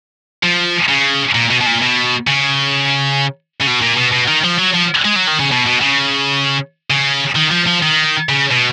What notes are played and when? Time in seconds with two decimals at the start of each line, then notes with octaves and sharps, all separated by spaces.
0.43 F3
0.89 C#3
1.35 A#2
1.50 B2
1.61 B2
1.66 A#2
1.82 B2
2.27 C#3
3.61 C#3
3.67 B2
3.82 A#2
3.97 B2
4.12 B2
4.27 D#3
4.44 F3
4.58 F#3
4.73 F3
5.05 G#3
5.16 F#3
5.27 D#3
5.39 C#3
5.52 B2
5.67 B2
5.82 C#3
6.90 C#3
7.36 D#3
7.51 F3
7.67 F3
7.82 D#3
8.29 C#3
8.51 B2